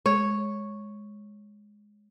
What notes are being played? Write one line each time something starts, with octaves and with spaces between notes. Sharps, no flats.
G#3 C#5